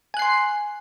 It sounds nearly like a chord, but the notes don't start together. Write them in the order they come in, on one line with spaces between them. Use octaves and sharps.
G#5 F#6 C7 C6